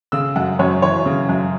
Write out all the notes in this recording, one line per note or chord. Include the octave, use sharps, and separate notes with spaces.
C#3 E6
F#2 F#5
F#2 C#5
E3 C#5
C#3
F#2